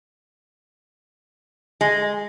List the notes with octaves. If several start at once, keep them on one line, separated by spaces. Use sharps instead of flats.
G#3